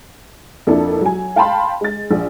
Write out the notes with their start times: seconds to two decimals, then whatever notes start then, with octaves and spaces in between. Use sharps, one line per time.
0.67 F2 A#3 D4 E4 A4
1.01 F#3 G#5
1.36 F5 G5 A5 B5 C6
1.81 G#3 A6
2.11 A#1